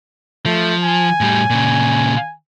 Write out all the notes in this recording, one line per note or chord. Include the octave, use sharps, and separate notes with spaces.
F3 A3
G#5
A2 G3
A#2 C#3